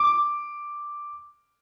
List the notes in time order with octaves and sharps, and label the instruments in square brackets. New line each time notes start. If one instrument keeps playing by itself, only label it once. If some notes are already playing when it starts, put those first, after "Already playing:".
Already playing: [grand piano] D6